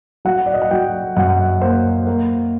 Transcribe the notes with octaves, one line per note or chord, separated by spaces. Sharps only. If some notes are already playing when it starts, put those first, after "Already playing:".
F#3 F#5
D5
D#5
F#5
F#3 G5
F#2 F#5
A#3 C5
A#3